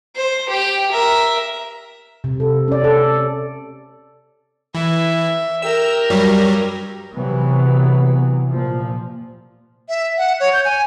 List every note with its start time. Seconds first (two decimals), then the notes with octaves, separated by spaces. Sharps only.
0.16 C5
0.49 G4 G5
0.91 A#4 E5
2.24 C3
2.40 A4
2.68 C#4 D5
2.84 A4
4.75 E3 E5
5.62 G4 A#4 E6
6.10 G2 F#3 G3
7.14 C3 E3 F#3 B3
8.50 A#2 F3
9.89 E5
10.18 F#5
10.40 C#5
10.53 G6
10.65 G#5